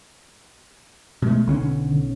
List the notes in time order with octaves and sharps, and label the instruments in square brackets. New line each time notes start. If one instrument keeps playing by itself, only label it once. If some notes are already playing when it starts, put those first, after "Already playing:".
[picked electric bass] B2 G#3 A3
[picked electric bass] B1 C4 C#4 [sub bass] D3